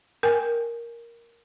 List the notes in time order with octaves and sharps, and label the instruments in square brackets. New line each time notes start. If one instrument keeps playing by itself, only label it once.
[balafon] A#4 G5 G#5